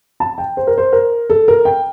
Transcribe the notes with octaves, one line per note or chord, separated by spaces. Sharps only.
A5
G5
C5
A#4
C5
A#4
A4
A#4
G5